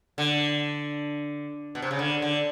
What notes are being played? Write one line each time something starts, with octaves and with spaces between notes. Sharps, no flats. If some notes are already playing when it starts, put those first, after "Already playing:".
D3
B2
C3
C#3
D3
D3